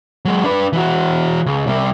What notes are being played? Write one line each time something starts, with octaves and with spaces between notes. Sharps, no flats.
F#3 G#3
D4 B4
E3 F#4
C#2
C2 C3